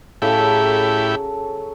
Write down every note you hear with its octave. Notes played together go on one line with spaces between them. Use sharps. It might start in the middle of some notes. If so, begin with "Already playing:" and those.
A2 C#3 F#3 E4 G4 A4